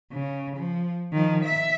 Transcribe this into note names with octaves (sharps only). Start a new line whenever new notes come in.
C#3
F3
D#3 F3
E5